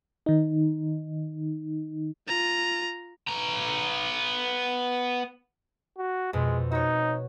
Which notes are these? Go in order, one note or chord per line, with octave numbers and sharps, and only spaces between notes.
D#3 D#4
F4 A#5
B3 A#5
F#4
F2 B2 G#3
D#4 F#4 C#5